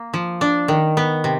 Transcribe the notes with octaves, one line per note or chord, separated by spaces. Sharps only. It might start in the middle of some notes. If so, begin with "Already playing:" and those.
Already playing: A#3
F3
D4
D#3
B3
C3